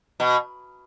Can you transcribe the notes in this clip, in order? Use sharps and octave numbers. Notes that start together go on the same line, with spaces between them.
B2